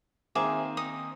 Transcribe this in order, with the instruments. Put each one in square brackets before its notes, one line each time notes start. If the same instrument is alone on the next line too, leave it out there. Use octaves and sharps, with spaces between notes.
[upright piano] D#3 A#3 C4 [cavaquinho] G#4 E5 D6
[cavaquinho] D#4 D#6